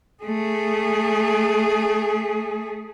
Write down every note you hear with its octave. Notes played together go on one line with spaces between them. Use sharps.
A3 G#4